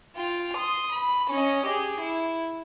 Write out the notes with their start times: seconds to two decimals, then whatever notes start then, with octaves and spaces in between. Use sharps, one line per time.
0.16 F4 G5
0.57 C6 D#6
0.93 B5
1.30 C#4 D#5
1.66 G4 G#4
2.01 E4